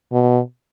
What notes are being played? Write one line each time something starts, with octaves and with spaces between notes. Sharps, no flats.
B2